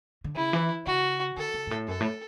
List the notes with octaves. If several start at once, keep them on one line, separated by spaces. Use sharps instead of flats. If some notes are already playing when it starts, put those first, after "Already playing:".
D3
C#3 E4
E3
C#3 F#4
D3 A4
C#3
G#2
A2
F#2 A4
A2